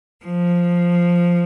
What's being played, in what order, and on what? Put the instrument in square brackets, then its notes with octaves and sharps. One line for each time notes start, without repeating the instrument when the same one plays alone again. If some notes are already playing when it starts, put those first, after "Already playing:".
[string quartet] F3